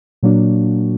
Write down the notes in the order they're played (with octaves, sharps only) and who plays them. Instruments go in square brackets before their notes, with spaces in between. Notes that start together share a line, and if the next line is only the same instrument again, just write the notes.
[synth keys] A#2 F#3 A#3 D4 F#4